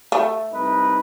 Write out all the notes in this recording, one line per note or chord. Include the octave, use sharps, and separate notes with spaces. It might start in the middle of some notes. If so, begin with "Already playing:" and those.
A3
C2 D#4 B4